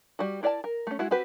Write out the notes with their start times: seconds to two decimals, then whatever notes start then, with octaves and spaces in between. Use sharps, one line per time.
0.19 G3 F#4
0.43 E4 A#4 D5 G5 A5
0.64 A#4
0.87 A3 C#4
0.99 G#3 E4 F#4
1.11 C4 F#4 G4 B4